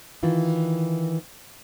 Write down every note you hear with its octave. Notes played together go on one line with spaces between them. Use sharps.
D#3 E3 F4